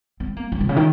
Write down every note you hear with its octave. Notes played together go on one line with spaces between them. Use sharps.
C4
A#3
A#3
C3
C#3
D#3